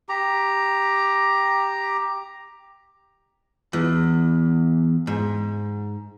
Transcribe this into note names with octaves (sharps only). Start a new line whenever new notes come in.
G4 A#5
E2
G#2